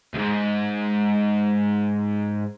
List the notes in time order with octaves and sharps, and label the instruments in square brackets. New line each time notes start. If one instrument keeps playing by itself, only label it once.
[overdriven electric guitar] D2 G#2